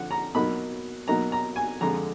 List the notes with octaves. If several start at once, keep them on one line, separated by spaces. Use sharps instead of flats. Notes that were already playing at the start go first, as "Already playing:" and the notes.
Already playing: D3 F3 F#5
A#5
B2 F#3 A#3 D#4 B5
B2 F#3 A#3 D#4 A#5
A#5
G#5
F2 D3 G#3 A#5